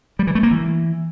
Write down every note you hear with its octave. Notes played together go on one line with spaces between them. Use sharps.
G3
E3
A3
A#3
E3